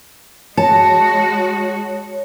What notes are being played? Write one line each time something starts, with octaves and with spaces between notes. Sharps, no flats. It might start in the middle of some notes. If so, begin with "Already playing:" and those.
G#3 F#4 C#5 A5